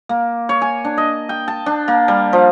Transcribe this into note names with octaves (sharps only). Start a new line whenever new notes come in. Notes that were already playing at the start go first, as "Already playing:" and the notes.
A#3
C#5
G#5
D4
D#5
G5
A5
D4
A#3
G3
F3